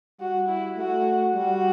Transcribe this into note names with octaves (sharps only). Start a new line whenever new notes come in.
G3 F#4
E4
A3 F#4
G3 F#4